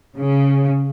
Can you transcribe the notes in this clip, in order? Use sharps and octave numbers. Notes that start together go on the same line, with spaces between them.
C#3